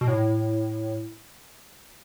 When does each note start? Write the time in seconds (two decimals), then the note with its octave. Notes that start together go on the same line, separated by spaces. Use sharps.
0.01 B2
0.08 A2